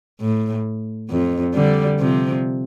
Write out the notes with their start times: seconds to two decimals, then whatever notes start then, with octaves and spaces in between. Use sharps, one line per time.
0.21 A2
1.11 F2
1.55 D3 G3
2.00 C3 F3